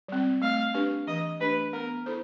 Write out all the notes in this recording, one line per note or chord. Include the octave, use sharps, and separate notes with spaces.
G3 C4
A3 F5
D4 G4 B4
E3 D#5
A3 D4 G4 B4
B3 A#4
E4 A4 C5